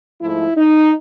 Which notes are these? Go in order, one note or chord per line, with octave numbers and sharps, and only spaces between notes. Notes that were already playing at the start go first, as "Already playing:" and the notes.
G#2 F3 A3 E4
D#4